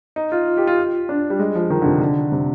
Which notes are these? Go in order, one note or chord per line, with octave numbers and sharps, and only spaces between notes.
D#4
F4
G4
F4
D4
G3
G#3
F3
D#3
D3
C3
D3
C3